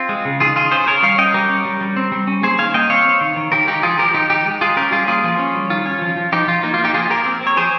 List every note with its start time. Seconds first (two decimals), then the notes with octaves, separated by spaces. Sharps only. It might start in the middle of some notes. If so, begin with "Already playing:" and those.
Already playing: C4 F4
0.09 G#3
0.25 C#3
0.40 D#3 F4 G#4
0.56 D#3 F4 G#4
0.71 C#4 G#4 C5
0.87 C#4 A#4 C#5
1.03 G3 C#5 F5
1.18 C#4 D#5 G5
1.34 G3 G4 A#4
1.49 C#4
1.65 G3
1.81 G3
1.97 C4
2.12 G3
2.27 C#4
2.43 A#3 G#4 C5
2.59 D#3 F5 G#5
2.74 A#3 D#5 G5
2.90 C4 C#5 F5
3.05 C4
3.21 D#3
3.36 D#3
3.52 D#3 G4 A#4
3.67 G#3 D#4 G4
3.83 F3 F4 G#4
3.99 F3 G4 A#4
4.14 D#3 D#4 G4
4.30 D#3 D#4 G4
4.46 G#3
4.61 G#3 F4 G#4
4.77 C#4 G4 A#4
4.92 G3 F4 G#4
5.08 A#3 F4 G#4
5.24 F3
5.39 C#4
5.54 G3
5.70 D#3 F4
5.86 C#4
6.02 F3
6.17 F3
6.32 F3 D#4 G4
6.48 F3 F4
6.63 A#3 D#4
6.74 A#3 F4
6.84 D#4 G4
6.94 F3 F4 G#4
7.10 A#3 G4 A#4
7.26 C4
7.41 C4
7.47 C#5
7.57 F3 G#4 C5